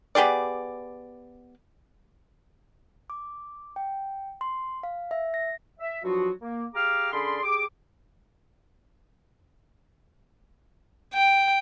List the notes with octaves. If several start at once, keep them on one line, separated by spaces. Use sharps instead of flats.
B3 G4 G#4 D5
D6
G5
C6
F5
E5
A#6
E5
G2 F3 F#3 F4 F#4
A#3
G4 G#4 F5 A#5 D6 F6
D3 C#4 G#4 D5 B5 C6
G4 G#4 D6
G5